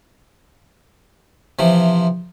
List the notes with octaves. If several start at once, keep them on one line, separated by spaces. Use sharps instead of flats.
C3 E3 F3